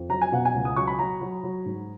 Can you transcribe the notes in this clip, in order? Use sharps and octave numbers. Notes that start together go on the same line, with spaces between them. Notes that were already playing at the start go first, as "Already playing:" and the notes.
Already playing: F2
F#3 A#5
G#5
B2 F#5
G#5
C#2
D#6
F#3 C#6
B5
F#3 A#5
F#3
F#3
G#2